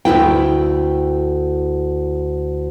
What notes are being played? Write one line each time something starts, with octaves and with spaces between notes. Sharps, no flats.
D2 G2 E4 G5